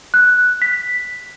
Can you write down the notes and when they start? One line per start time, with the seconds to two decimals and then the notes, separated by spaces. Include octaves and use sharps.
0.14 F#6
0.62 B6